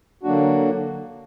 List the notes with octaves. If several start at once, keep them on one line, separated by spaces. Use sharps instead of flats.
D3 F#3 A#3 D4 F#4